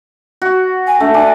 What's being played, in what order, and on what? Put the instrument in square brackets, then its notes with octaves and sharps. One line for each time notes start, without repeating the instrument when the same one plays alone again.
[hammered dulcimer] F#4
[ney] G#5
[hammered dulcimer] A3 [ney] D4
[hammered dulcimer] D4 [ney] G#5